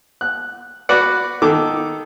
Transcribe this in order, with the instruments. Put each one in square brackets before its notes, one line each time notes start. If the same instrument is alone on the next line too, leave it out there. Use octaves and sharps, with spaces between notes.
[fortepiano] F#6
F#4 B4 D5 F#5
D#3 A4 D6